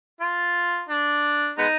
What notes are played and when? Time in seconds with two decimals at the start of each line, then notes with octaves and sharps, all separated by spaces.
0.21 F4
0.89 D4
1.58 G#3 B3 D#4